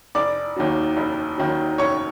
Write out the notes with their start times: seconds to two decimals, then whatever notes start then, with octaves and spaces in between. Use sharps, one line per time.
0.15 F1 D5 D6
0.56 D#2 D#3 F#3
0.97 F1
1.38 D#2 D#3 F#3
1.78 F1 C#5 C#6